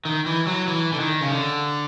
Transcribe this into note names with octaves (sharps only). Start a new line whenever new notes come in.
D#3
E3
F#3
E3
D3
D#3
C#3
D3